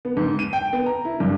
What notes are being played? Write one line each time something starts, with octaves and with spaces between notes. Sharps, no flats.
B3
G#2
D#7
G5
B3
A#5
E4
G2